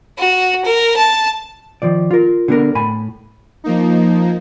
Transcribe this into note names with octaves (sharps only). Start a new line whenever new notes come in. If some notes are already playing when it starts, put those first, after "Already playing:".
F#4
A#4
A5
D#3 F3 D5
F4 A#4
D3 B3 A#4
A2 G#5 B5
F3 A#3 D#4